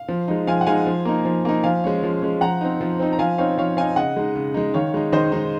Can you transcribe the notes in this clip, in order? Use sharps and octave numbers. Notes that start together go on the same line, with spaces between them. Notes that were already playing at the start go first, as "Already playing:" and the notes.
Already playing: F5
F3
G#3 D#4
F3 F5 G#5
F#5
G#3 D#4 F5 G#5
F3
A#3 D#4
F3
A#3 D#4
F3 F5 G#5
G#3 C#4
F3
G#3 C#4
F3 F#5 A#5
C4 D#4
F3
C4 D#4
A#5
F3 F5 G#5
C4 D#4 C#5 F5
F3 C#5 F5
C4 D#4 F5 G#5
C#3 D#5 F#5
G#3 D#4
C#3
G#3 D#4
D#3 C#5 F5
G#3 D#4
D#3 C5 D#5
G#3 D#4